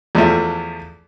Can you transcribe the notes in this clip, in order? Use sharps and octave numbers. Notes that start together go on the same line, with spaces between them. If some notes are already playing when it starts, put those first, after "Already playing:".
E2 F3 A3 E5